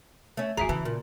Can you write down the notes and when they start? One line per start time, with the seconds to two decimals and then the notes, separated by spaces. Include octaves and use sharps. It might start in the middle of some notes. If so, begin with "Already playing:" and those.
0.37 A3 C#4
0.57 F1 D#3 F#4 G#4 E5 A#5
0.69 C#3 E3 A5
0.85 A#2